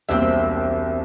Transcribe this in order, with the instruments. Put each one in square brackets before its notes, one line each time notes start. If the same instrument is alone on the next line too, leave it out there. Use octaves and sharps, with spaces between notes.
[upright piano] E1 C2 A#3 [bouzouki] C4 E5